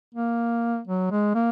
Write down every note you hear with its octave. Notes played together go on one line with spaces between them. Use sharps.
A#3
F#3
G#3
A#3